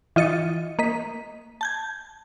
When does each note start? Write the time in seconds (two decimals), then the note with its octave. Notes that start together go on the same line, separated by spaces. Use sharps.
0.16 E3 F4 D#5 A6 C#7
0.79 A#3 D#5 B6
1.61 A5 G6 G#6